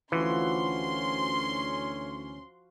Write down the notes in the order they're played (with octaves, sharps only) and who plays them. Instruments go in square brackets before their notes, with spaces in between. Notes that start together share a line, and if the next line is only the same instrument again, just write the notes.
[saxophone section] D2 C#4 [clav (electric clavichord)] E3 [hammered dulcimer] F3 F#4 [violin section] C6